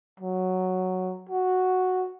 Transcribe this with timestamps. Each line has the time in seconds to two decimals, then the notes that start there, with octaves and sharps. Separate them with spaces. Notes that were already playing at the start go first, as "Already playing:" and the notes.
0.20 F#3
1.30 F#4